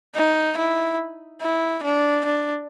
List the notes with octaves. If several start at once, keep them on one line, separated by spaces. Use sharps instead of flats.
D#4
E4
E4
D4
D4